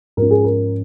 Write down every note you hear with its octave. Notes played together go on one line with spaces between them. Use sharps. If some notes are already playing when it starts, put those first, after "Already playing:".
G#2 F3 C#4 A#4
G#4
A#4